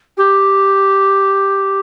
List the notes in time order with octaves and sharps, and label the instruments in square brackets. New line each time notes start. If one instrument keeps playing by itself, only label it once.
[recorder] G4